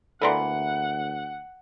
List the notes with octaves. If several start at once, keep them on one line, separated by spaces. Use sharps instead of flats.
D2 E3 A#3 B3 A4 D5 F#5 C6